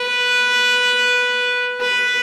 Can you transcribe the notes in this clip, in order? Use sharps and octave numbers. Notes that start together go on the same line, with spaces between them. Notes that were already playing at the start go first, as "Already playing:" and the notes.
Already playing: B4
B4